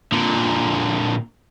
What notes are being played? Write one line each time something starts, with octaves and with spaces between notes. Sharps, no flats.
A#2 D3